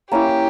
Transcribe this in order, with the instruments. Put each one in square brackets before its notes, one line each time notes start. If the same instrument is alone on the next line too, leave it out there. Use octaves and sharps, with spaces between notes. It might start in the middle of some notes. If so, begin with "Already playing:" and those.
[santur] A#3 C#4 E4 [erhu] G4